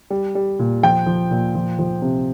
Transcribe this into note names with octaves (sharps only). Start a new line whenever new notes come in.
G3
G3
A#2
F3 G5
F3
A#2
F3
F3
C3